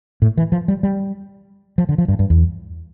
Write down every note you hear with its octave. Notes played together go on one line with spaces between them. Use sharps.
A2
E3
F3
G3
G3
F3
D3
F3
G2
G2
E2